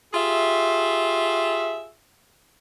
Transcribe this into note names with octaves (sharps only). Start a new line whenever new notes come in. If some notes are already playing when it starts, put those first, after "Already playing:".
F4 G4 G#4 E5